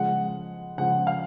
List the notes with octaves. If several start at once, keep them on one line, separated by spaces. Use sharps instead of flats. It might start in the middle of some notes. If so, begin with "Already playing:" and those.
Already playing: C#3 F3 G#3 F#5
C#3 F3 G#3 F#5
F5